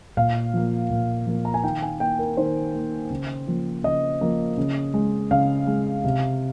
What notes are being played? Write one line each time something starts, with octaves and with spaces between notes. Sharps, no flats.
A#2 F5
F3 A#3
A#2
F3 A#3
A#5
G#5
D#3 G5
G#5
A#3 G5
A#4
D#3 C5
A#3
C#3
F3 A#3
C#3 D#5
F3 A#3
C#3
G#3
C#3 F5
G#3
C3